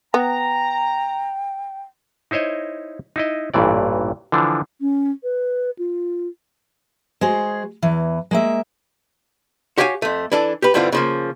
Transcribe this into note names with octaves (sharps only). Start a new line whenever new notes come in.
B3 G5 A#5
D#4 E4 C5 C#5 D#5
D#4 E4 D#5
A1 G2 A#2 E3 D5
D3 E3 F3 D4
C#4
B4
F4
G#3 F#4 G#4 C5
E2 E3
G#3 A#3 E5
F#4 G4 C#5 F5 G5 G#5
F2 A3
E3 D4 A4
G4 B4
G2 D3 E3 G3 C4 F4
C#3 F3 A#3